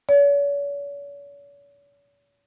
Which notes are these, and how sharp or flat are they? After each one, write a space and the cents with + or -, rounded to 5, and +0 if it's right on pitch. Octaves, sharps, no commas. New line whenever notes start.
C#5 +45